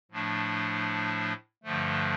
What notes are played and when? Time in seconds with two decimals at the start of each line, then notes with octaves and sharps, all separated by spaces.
0.11 A2 F3 A3 D4
1.63 G2 D3 F3 A3